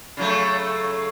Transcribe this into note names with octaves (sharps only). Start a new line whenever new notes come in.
C#3 F#3 A3